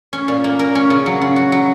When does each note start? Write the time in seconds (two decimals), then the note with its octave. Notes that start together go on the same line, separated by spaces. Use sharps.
0.13 C#4
0.28 A#2
0.44 A#3
0.59 A#4
0.75 C#4
0.90 C#3
1.06 F#3
1.22 C#3
1.36 F#4
1.52 F#3